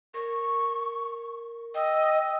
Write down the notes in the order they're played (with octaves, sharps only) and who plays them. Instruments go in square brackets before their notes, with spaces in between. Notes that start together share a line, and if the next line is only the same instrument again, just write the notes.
[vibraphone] A#4 [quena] C#6
[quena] D#5 [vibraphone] G5 E6